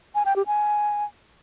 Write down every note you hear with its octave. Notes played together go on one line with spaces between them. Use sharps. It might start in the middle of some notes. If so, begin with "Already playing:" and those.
G#5
G5
G4
G#5